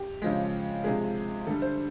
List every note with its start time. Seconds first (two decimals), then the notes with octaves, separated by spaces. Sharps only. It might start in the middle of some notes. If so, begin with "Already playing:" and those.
Already playing: G4
0.22 C#3 F3 G#3
0.84 C3 F3 G#3 G#4
1.46 D3 G3 A4
1.62 C5